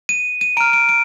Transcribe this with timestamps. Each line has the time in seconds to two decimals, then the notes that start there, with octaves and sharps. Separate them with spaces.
0.09 D#7
0.41 D#7
0.57 A#5 D7
0.60 F6
0.73 D7
0.89 D7